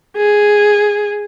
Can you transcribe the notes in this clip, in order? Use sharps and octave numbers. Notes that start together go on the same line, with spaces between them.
G#4